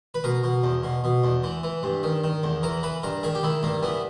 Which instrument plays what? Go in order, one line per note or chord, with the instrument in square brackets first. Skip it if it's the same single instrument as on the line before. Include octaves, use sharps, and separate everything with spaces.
[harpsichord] B4
B2 A#4
B2
E2
B2
B2
E2
E3
E3
G2
D#3
D#3
E2
E3 A#4
E3 B4
G2 A#4
D#3 G#4
G4
D#3 E4
G2 A#3
E3 B3